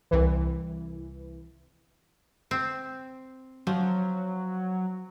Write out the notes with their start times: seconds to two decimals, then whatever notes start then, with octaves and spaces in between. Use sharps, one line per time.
0.11 C2 E3
2.51 C4
3.67 F3 F#3